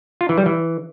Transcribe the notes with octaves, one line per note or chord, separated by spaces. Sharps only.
F4
E3
G3
E3